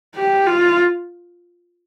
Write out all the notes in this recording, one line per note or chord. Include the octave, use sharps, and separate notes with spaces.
G4
F4